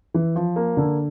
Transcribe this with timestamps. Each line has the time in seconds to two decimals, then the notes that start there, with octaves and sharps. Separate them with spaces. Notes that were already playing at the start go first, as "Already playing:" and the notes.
0.14 E3
0.36 F3
0.56 A#3
0.77 D3